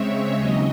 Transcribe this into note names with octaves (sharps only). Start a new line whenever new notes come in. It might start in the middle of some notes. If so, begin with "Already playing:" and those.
Already playing: C#3 G#3 C4 C#5 E5
D#2 C#3 F#3 D#5